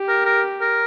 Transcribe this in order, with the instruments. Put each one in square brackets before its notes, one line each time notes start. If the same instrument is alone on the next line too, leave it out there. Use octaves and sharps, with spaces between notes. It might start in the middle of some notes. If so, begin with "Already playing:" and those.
Already playing: [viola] G4
[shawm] A#4
A#4
A#4